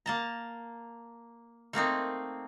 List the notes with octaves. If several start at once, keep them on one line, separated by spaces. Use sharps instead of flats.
A#3 A5 A#5
A3 A#3 C4 D#4